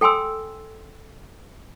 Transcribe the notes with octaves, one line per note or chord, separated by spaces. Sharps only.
A4 G5 G#5 C6 E6